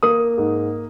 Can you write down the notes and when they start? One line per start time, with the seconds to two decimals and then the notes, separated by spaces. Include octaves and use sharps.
0.03 A#3 D#6
0.38 G#2